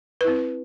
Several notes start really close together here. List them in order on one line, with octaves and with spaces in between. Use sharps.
B4 E4 C4